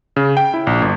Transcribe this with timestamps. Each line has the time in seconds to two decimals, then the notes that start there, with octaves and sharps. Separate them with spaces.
0.16 C#3
0.37 G5
0.54 E4
0.67 A#1
0.82 G1